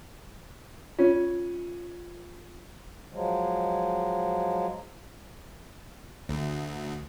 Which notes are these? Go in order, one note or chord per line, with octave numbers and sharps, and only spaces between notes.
C#4 F4
F3 F#3 G#3
D2